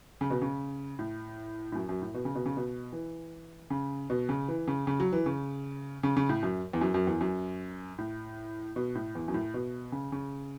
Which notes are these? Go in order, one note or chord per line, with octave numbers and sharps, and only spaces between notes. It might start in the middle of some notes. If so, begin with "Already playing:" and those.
C#3
B2
C#3
A2
A2
F#2
F#2
A2
B2
C#3
B2
C#3
B2
E3
C#3
B2
C#3
E3
C#3
C#3
F#3
E3
C#3
C#3
C#3
A2
F#2
E2
F#2
F#2
E2
F#2
A2
B2
A2
E2
F#2
A2
B2
C#3
C#3